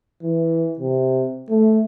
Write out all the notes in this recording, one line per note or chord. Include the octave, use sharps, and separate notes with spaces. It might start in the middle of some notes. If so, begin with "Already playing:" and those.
E3
C3
A3